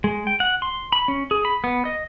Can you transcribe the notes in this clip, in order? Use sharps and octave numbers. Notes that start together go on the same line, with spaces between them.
G#3
G5
F#5
C6
B5
C#4
G#4
B5
B3
D#5